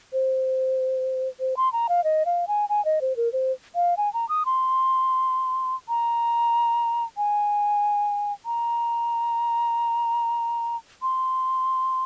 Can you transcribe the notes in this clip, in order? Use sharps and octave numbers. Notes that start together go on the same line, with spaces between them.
C5
C5
C6
A#5
F5
D#5
F5
G#5
G#5
D#5
C5
A#4
C5
F5
G#5
A#5
D#6
C6
A#5
G#5
A#5
C6